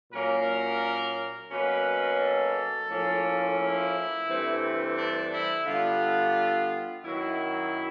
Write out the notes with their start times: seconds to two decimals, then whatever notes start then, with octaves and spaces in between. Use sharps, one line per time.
0.12 A#2 F#3 A#3 C#4 A#4
1.51 B2 F#3 A#3 C#4 B4
2.20 A4
2.89 A2 F3 A#3 C#4
3.58 E4
4.27 G2 E3 A3 C4
4.96 D4
5.31 E4
5.65 D3 G3 B3 F4
7.04 F#2 D#3 F#3 E4